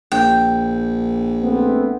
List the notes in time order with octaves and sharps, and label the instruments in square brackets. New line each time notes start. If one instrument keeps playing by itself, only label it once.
[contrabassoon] A#1 [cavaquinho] G5
[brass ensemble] A3 B3 C4